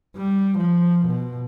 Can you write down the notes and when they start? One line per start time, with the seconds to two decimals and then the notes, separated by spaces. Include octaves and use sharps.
0.17 G3
0.58 F3
1.05 B2